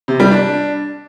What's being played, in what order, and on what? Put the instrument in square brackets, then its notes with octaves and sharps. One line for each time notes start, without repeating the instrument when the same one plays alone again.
[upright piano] C3
G3
D4